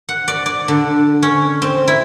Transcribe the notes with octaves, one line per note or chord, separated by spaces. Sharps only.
F#5
D5
D5
D3
C#4
C4
E4